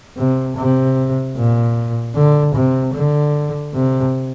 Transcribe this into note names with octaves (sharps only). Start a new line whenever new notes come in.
C3
C3
A#2
D3
C3
D3
C3